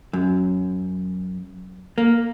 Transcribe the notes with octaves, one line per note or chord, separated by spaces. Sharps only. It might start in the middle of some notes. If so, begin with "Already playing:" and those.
F#2
A#3